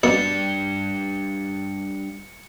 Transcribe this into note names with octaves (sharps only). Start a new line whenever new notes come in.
B2 G3 A#3 D4 D5 C#7